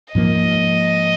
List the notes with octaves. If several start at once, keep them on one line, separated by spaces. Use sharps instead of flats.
G#2 F3 A#3 D#5